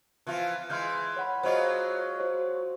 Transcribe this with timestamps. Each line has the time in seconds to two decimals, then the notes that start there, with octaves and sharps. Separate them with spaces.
0.27 E3 F3 F4
0.70 E3 G#3 C6 F6 G6
1.17 C#5 F#5 B5
1.43 F#3 G#3 F4 C5 D#5
2.20 F#4 C5 C#5